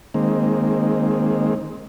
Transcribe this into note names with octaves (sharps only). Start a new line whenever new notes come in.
D#3 G#3 A#3 C4